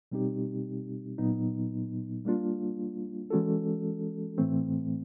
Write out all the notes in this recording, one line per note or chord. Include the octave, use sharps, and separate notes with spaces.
B2 G3 C4 D#4 G4
A#2 F#3 B3 D#4
G3 A#3 D4 F4
E3 G#3 C#4 F#4 A4
A2 E3 A3 C4